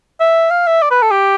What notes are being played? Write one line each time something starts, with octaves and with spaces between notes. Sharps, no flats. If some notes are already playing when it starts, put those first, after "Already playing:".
E5
F5
E5
D5
B4
A4
G4